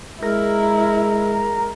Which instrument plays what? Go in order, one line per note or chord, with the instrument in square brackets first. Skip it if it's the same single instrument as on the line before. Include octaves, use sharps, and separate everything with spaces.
[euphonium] G#3 [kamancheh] E4 [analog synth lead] A#4